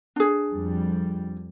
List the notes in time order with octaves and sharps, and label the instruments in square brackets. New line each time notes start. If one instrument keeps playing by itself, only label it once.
[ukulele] D4 G#4
[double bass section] F2 G3